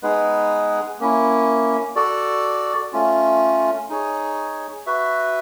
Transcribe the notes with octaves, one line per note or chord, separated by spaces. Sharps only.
G#3 B3 D#4 G#4 B4
A#3 C#4 E4
F#4 A4 D5
A3 C#4 F4
D#4 G#4 C#5
F#4 B4 E5